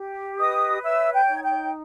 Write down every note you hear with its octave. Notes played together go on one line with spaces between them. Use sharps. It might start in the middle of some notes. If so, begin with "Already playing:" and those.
Already playing: G4
B4 D#5 D#6
C#5 E5 E6
G5 G6
D#4
G#6
G5 G6